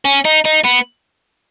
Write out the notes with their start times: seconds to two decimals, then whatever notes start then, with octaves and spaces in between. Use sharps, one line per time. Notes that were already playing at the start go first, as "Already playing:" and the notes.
0.05 C#4
0.25 D#4
0.45 D#4
0.64 B3